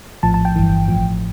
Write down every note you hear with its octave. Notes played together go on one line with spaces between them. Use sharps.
A#1 A2 F3 A5
A5
G5
G1 G2 E3
A1 A2 F3